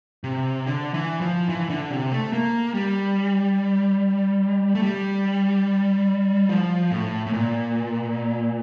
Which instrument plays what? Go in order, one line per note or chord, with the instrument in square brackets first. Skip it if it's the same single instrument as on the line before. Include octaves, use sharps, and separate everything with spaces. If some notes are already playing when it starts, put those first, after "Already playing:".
[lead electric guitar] C3
D3
E3
F3
E3
D3
C3
A3
A#3
G3
A3
G3
F3
A2
A2
A#2